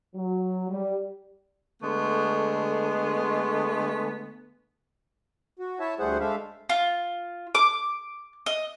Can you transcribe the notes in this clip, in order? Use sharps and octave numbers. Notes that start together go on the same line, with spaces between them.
F#3
G3
D3 G#3 A3 B3
F#4
E4 C#5 E5 A5
D2 G3 A3 G#4 C5 F#5
G#3 A3 D4 E5 F5
F4
D6
D#5